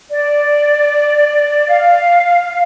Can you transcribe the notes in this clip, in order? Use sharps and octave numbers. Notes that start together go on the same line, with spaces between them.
D5
F5